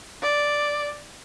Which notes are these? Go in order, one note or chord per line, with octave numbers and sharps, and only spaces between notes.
D5